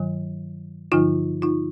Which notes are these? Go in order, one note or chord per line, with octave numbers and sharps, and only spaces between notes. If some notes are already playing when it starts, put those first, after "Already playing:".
Already playing: G2 D#3 F#3
G2 D3 F3 D#4 F4
D#4 F4